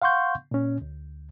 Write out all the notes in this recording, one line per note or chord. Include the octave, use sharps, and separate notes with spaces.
F5 F#5 C6 C#6 G6
A#2 C#4
D2